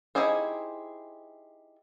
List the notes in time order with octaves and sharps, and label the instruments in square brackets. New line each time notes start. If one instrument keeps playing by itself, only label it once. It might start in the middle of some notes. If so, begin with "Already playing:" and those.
[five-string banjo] D#4 E4 G4 G#4 C5